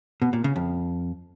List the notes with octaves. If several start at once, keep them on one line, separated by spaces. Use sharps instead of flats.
B2
A#2
C#3
F2